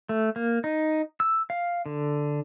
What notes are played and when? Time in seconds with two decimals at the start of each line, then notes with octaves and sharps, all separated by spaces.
0.09 A3
0.36 A#3
0.64 D#4
1.20 E6
1.50 F5
1.86 D3